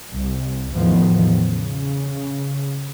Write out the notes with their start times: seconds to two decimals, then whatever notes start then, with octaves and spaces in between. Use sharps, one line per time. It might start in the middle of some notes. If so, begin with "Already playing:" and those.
0.11 C2
0.73 E2 A2 D#3 F3 B3
1.35 C#3